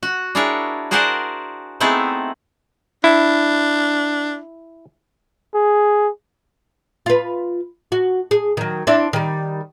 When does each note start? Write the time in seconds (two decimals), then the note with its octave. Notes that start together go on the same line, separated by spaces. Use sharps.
0.03 F#4
0.35 D4 E4 G#4 A#4 C#5
0.91 F#4 G#4 A#4 C5 D5 F#5
1.80 A3 B3 C4 D#4 E4 G#4
3.04 D4 E4
5.55 G#4
7.06 F4 B4
7.92 F#4
8.31 G#4
8.57 D#3 F#3
8.87 C4 D4 E4
9.13 D#3 G3